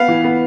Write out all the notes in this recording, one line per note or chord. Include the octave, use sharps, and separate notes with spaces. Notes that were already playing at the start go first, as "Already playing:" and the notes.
Already playing: B3 F5
E3
B3